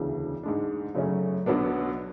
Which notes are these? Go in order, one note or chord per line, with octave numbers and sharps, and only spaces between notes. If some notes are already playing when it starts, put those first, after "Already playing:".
Already playing: E1 D2 C#3 E3
G#2 G#3 D4
F#2 C#3 F#3 A3 C#4
B1 B2 F#3 B3 D4